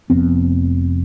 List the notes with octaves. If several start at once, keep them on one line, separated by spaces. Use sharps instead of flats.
F1 F2 B3 C4